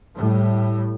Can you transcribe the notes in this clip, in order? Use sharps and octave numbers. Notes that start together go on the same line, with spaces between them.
A2 G3